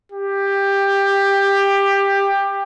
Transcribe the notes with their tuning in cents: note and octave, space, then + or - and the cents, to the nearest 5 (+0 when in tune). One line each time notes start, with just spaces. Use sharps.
G4 +15